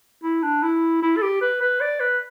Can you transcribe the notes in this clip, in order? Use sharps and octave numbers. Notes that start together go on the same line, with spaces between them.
E4
D4
E4
E4
A4
G4
B4
B4
D5
B4